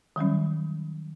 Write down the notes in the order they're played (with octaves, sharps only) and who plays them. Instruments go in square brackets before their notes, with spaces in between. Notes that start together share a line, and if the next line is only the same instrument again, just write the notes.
[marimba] D#3 F#3 G3 C#4